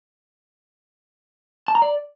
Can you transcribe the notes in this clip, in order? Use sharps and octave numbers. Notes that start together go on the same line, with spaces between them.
A5
A#5
D5